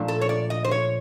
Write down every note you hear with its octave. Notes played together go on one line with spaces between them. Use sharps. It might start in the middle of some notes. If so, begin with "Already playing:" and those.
Already playing: A#2 F3 A3 D4
A4
C#5
D5
D#5
C5
C#5